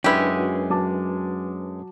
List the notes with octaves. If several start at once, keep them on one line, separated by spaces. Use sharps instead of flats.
F#2 G#3 D4 E4 G4 B4
F#4
F#3 A5 D6